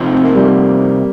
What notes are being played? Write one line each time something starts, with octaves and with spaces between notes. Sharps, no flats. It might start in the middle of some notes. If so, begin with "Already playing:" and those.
Already playing: C3 F3 D#4
C4
A#3
G3
A#3